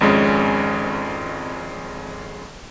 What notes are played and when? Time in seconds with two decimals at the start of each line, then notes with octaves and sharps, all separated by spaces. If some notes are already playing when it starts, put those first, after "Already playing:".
0.01 G#1 F2 G#3 C#4